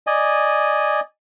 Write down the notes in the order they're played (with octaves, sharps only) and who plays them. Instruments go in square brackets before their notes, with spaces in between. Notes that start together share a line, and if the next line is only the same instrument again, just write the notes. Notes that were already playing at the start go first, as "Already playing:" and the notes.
[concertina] D5 D#5 G#5